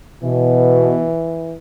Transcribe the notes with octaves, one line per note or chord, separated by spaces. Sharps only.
B2 E3